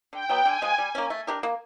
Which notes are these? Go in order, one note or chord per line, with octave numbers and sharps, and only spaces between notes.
D3 G5
F#3 B3
D3 G#5
F3 G#3
G3
A#3 C#4
A3
D4 G4 A#4
A#3